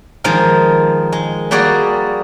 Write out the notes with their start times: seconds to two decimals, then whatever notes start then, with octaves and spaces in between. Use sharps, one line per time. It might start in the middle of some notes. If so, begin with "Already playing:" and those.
0.24 D#3 F3 G#3 D#4 A#4
1.12 G#3
1.51 G3 A#3 F#4 G#4 D5